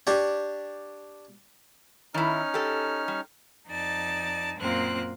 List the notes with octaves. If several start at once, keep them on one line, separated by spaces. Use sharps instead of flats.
D4 G4 C#5
D#3 C#4 D#4 E4 F6
G4 A4
G3
F2 D#4 D5 A5 A6
F#2 A#2 A#3 C4 F4 F#6